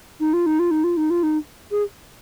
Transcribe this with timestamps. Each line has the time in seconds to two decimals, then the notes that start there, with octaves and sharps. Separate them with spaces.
0.20 D#4
0.33 F4
0.46 D#4
0.59 F4
0.71 D#4
0.84 F4
0.97 D#4
1.10 F4
1.23 D#4
1.71 G#4